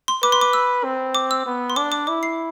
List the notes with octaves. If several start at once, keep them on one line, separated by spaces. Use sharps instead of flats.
C6
B4 D6
C6
D6
E6
C4
D6
E6
B3
C6
D4 D6
D6
E4 D6
C7